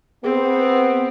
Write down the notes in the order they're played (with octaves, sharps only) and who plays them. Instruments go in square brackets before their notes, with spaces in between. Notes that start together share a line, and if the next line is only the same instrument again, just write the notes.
[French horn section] B3 [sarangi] C4 [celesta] G#4